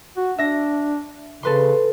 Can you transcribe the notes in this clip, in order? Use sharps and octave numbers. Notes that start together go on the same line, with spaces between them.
F#4
D4 E5 A#6
C#3 A4 B4 C6